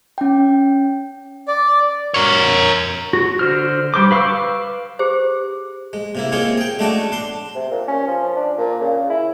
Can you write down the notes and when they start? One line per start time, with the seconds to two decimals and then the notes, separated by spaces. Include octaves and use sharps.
0.18 C#4 G5
1.48 D5
2.14 A#4 C#5
3.13 F#4
3.39 D3 C5 F6
3.94 G3 C5 D6
4.11 B4 F5 C#6 D6 E6
4.99 G4 G#4 C5
5.93 G#3
6.15 C3 A#3 E4
6.32 G#3 A#3 C4 F4 G#4 C#5
6.58 G#4 G5
6.79 G#3 A3 C#4 D4 F#4 D5
7.12 D4 C6
7.55 C3
7.71 A#2
7.88 C#4
8.08 F3
8.36 D4
8.58 A#2
8.81 C#3
9.10 E4